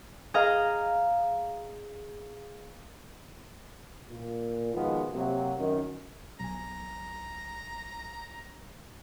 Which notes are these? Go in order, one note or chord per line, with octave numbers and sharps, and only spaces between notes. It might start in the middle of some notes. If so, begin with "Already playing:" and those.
G#4 D#5 F5 A#5
A#2
B2 D#3 F3 G#3 B3 F4
C3 F#3 A#3
F#2 D#3
B1 G#5 A#5